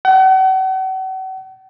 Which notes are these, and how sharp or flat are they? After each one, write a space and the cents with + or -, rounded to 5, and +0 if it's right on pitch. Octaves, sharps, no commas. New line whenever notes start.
F#5 +40